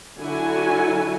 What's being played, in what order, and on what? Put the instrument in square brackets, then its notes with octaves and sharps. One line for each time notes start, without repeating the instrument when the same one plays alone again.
[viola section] D3 F#3 E4 F#4 A4 G#5